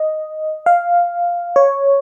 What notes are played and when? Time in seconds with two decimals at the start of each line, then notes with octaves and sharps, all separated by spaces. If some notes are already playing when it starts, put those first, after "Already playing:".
Already playing: D#5
0.66 F5
1.56 C#5